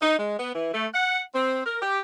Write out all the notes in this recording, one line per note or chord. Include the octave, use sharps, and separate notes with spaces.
D#4
G#3
B3
E3
A3
F#5
C4
A#4
G4